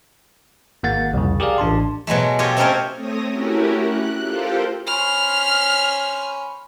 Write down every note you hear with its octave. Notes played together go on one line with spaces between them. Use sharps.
G#1 A#3 F#5 A6
C2 F2 C#3
G4 G#4 A#4 D5 F5
A1 D4 A5 C6
B2 F#3 G#3 A3
F4 G4 A4 C#5 D#5
A3 C4 C#4 A#4 C5 C#5
A3 C4 C#5 D#6 A#6
A3 C#4 E4 F#4 G4 A#4
F#6
F4 G4 A4 A#4 C5 F5
C#4 C5 B5 F6